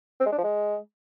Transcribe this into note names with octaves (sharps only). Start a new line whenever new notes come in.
C4
G#3
D4
F3
G#3